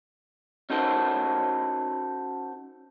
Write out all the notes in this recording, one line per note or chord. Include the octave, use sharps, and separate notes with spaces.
C#4 D#4 F#4 A4 A#4 C5